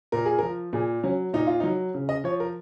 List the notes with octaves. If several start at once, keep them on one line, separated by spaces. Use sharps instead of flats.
A#2 A#4
G#4
F3 A#4
A#2 G#4
F#3 C#4
A#2 D#4
F4
F#3 D#4
C#3
D#5
F3 C#5
A#4